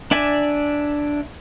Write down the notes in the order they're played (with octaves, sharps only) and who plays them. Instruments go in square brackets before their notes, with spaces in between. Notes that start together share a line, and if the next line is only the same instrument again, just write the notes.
[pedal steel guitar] D4 D5 E5 G#5